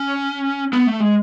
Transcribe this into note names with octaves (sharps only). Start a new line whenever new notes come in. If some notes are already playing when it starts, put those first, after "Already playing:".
Already playing: C#4
B3
A3
G#3